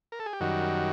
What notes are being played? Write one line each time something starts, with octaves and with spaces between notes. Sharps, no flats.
A#4
A4
G#4
G4
F#2 D#3 G3 F#4